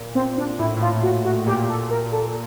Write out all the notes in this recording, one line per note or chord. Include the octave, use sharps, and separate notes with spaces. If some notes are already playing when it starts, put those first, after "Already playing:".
Already playing: A#2
C4
D4
A2 E4
A2 F4
F#4
F#4
A#2 G4
A4
A#4
A4